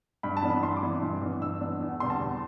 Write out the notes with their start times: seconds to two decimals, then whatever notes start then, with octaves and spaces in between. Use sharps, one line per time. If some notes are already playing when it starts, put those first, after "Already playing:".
0.23 G2 B5
0.37 A5
0.43 E3 B3 D4
0.50 B5
0.63 G2 C6
0.77 D6
0.83 E3 B3 D4
1.02 G2
1.21 E3 B3 D4
1.41 G2 E6
1.61 E3 B3 D4
1.81 E2
2.00 D3 G3 B3 C6
2.10 A5
2.20 E2